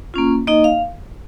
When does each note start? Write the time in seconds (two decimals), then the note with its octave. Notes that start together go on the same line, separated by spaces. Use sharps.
0.14 A#3 C#4 F4
0.47 A#3 D#4 D#5
0.64 F5